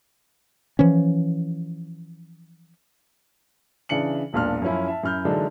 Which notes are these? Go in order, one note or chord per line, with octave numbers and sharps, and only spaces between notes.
E3 F3 C#4
C#3 E3 D4 C#7 F#7
E1 B1 A#2 D4 F6
F#2 F3 C#4 E4
E5 A5
F#2 E4 F6 G6
D3 E3 F#3 G#3 D4 D#4